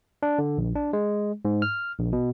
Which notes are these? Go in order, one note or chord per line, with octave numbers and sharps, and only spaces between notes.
D4
D3
A#1
D4
G#3
G#2
F6
A#1
B2